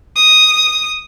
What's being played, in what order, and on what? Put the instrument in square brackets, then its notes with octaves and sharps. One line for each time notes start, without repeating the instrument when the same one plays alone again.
[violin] D#6